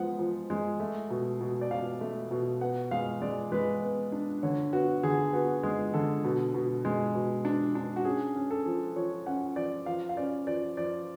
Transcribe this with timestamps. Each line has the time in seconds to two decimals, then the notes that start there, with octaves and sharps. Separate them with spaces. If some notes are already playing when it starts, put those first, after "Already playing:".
Already playing: F3 G#3 B3 F#5
0.19 F3
0.50 G#3
0.80 A3
1.10 B2
1.41 B2
1.61 D5
1.71 B2 F5
2.01 A3
2.31 B2
2.61 B3 F#5
2.91 G#3 F5
3.22 G#3 D5
3.52 G#3 B4
3.82 B3
4.12 D4
4.43 D3 C#5
4.73 B3 F#4
5.03 D3 G#4
5.33 B3 F#4
5.63 G#3 G#4
5.94 D3 A4
6.24 B2
6.54 B2
6.85 G#3
7.15 B2
7.45 D4
7.75 D4
7.96 F#4
8.05 C#4 G#4
8.36 C#4
8.51 A4
8.66 F3
8.96 F3 C#5
9.26 C#4 F#5
9.56 F3 D5
9.86 F3 F5
10.09 F5
10.17 C#4 D5
10.47 F3 D5
10.77 F3 D5